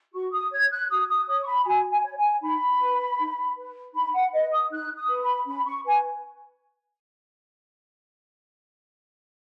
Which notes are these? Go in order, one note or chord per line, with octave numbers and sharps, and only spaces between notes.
F#4 C#6
D#6
C#5 G#6
F#6
F#4 D#6
D#6
C#5 D#6
C#6
B5
F#4 G#5
G#5
C#5
G#5
D#4 B5
B4
D#4
B4
D#4 B5
F#5
B4 D#5
D#6
D#4 F#6
D#6
B4
B5
C#4 B5
C#6
B4 G#5